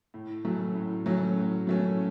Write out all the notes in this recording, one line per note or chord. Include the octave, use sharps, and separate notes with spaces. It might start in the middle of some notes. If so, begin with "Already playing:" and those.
A2
F#3 A3 C#4
A2
F#3 A3 C#4
A2
F#3 A3 C#4